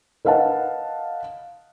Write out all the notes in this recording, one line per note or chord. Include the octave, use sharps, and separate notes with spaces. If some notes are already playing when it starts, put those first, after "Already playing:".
A#4 B4 D#5 F5 F#5 A5